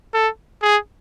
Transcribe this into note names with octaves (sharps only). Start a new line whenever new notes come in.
A4
G#4